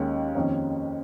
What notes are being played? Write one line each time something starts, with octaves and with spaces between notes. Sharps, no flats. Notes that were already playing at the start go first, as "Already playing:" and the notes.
Already playing: D#2 D#3 G#3 C#4
F2 D#3 A#3 C#4